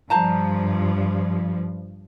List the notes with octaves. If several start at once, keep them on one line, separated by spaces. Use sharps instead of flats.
G2 F3 C5 A5 A#5